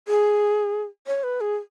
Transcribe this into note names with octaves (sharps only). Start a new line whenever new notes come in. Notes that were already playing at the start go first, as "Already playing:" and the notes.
G#4
C#5
B4
G#4